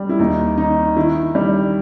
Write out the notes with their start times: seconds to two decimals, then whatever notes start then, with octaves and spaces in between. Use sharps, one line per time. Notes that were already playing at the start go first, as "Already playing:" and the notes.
Already playing: G3
0.09 E4
0.19 D#2 D#4
0.58 D#3 D#4
0.97 D#3 E4
1.35 G3